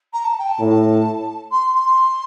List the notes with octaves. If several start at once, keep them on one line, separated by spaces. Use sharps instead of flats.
A#5
A5
G5
A5
A2
C6
C6